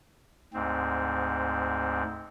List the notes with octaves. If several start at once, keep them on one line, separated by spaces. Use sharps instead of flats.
D2 G#2 C4